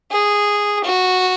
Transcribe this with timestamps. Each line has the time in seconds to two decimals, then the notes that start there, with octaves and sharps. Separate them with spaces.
0.11 G#4
0.84 F#4